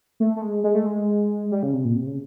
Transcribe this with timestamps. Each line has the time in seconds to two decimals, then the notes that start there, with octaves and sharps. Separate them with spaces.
0.20 A3
0.36 A3
0.42 G#3
0.64 G#3
0.75 A3
0.86 G#3
1.51 G3
1.63 C#3
1.74 C3
1.85 A#2
1.96 C3
2.06 C#3